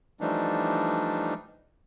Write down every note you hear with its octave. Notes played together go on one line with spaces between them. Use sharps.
E3 F3 G3 A3 D4 D#4